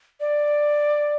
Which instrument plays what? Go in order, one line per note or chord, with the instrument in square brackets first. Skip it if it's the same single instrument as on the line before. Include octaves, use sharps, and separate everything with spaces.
[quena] D5